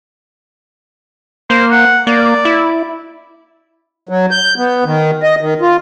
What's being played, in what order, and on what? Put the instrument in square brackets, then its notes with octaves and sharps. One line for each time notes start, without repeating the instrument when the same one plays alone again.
[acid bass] A#3 [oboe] C5
[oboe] F#5
[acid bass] A#3 [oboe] D5
[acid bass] E4
[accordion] F#3
G6
B3
D#3
D#5
D#3
F4